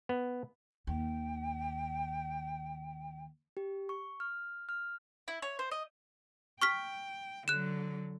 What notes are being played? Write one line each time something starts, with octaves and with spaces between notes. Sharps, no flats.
B3
D#2 G5
G4
C#6
F6
F6
E4
C#5
C5
D#5
G5 C#6 F6 B6
D3 F#3 F#6 E7